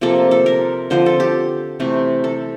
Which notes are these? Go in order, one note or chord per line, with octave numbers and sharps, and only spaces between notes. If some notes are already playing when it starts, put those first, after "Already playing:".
C3 F3 A#3 A4
A4
A#4
D3 F3 C4 C5
A4
G4
C3 E3 A3
A4